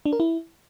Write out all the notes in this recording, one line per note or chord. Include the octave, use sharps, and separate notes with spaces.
D4
A#4
E4